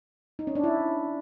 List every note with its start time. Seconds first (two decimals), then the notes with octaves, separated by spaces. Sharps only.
0.39 D#4
0.47 C#4
0.55 D4
0.64 E4